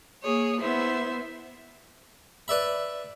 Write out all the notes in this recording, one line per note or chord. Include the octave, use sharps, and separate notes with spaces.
A#3 G#4 C#5
B3 E4 C5 E5
B4 D5 E5 B5